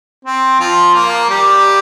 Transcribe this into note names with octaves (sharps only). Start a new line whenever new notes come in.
C4
F3 F4
A#3 A#4
G3 G4